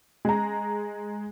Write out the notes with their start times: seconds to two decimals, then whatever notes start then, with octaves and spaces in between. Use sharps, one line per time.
0.25 G#3 A#5